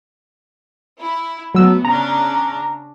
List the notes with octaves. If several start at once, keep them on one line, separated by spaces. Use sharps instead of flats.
E4
F#3 A3 B3 E6
C#3 C#4 D4 A#5